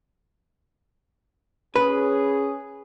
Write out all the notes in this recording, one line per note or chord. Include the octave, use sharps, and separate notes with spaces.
C#4 G#4 B4